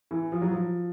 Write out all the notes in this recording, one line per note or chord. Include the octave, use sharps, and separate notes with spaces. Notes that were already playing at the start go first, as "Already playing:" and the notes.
E3
F3
F#3
F3